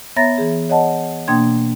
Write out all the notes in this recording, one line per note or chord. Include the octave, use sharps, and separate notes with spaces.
B3 C#5 E5 A#5 A6 A#6
E3 G#4
C#5 D#5 F#5 A5
B2 A#3 D4 G5 C6 G#6